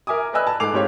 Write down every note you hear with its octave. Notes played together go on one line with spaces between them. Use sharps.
A#4 E5 G#5 D6 D#6
B4 D5 D#5 G#5 E6 F#6
A5
G#2 A4 D6 C7 F7
G#2 C4 G4 C#5 F5